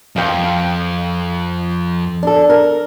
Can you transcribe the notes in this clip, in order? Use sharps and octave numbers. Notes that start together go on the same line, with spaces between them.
F2 F5 G5
D4 A4
A#4